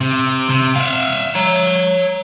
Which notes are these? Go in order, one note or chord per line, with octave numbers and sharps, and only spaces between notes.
C3
C3
E5 F5
C#5 A#5